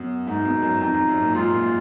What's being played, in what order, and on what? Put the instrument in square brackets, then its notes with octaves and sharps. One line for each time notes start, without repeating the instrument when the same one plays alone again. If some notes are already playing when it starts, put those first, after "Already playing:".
Already playing: [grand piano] F#2 [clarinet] B3
[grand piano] G#2 [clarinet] D#4
[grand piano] B2
F#2
[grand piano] F2 [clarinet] D#4
[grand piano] F2
F#2
A#2
[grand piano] G#2 [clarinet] F4
[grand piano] A#2